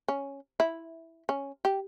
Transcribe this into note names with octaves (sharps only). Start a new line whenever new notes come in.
C#4
E4
C#4
G4